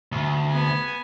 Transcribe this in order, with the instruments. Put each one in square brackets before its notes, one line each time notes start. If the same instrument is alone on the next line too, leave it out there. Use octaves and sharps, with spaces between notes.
[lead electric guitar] D2
[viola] B3 G#5